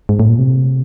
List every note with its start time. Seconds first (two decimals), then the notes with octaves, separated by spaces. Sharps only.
0.09 G#2
0.20 A2
0.29 A#2
0.39 C3